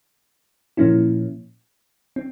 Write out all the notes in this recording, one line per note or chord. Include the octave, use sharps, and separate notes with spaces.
A#2 F3 A#3 C#4 E4
C4